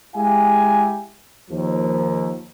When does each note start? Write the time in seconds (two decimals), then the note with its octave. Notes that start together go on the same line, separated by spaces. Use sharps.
0.14 G#3 E4 G4 F5 G#5
1.50 D#2 F3